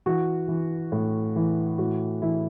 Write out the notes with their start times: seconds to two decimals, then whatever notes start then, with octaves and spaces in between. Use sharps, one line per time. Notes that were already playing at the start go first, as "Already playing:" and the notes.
0.06 E3 F#4
0.48 E3
0.92 A2
1.36 E3
1.78 A2 F#4
2.22 E3 E4